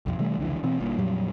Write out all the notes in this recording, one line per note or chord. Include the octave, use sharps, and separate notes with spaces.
B1 F2
C3 E3 G3 A3
F1 C#2 D3 E3
B2 E3 C4
G1 G2 A#2
F2 A#2 F#3 G3